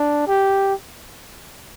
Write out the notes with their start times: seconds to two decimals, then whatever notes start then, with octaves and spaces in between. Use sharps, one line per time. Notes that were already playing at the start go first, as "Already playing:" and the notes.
Already playing: D4
0.28 G4